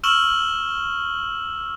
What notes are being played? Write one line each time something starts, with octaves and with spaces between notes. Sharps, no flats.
C#6 E6 F6 E7 F#7